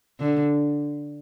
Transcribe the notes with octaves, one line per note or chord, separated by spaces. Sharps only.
D3